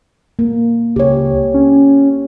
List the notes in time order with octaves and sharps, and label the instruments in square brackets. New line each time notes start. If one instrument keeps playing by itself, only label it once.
[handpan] A#3
[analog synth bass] C#2 [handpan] G4 C#5
[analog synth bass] C#4